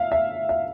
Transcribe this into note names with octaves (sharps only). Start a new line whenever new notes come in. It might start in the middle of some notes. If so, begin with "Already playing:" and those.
Already playing: E5 F5
E5
E5